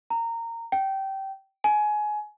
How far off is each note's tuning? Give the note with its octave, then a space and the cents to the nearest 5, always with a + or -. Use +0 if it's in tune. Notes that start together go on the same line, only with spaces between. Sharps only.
A#5 -20
G5 -20
G#5 +20